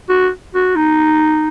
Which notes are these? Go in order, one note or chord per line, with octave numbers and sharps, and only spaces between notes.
F#4
F#4
D#4